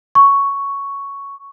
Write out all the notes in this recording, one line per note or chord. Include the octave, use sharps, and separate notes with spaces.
C#6